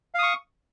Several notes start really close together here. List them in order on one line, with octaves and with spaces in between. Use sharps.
F5 D#6 C#6